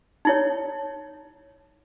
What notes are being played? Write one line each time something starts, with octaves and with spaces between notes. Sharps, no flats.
D#4 E4 C#5